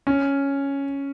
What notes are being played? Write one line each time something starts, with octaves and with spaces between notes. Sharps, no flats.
C#4